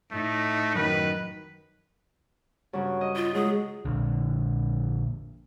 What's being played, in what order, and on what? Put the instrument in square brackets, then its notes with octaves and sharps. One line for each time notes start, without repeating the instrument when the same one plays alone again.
[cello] A2 D#4 [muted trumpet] A3
[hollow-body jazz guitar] F#2 [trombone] D#3 [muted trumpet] B4
[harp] G2 C#3 [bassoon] F#3
[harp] D#5
[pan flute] F4
[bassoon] F#3 [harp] G#3 [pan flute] G#4
[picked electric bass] A#1 D3